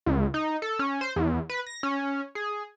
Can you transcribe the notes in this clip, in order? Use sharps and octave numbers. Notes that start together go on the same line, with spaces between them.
C#2
D#4
A4
C#4
C5
E2
B4
A#6
C#4
G#4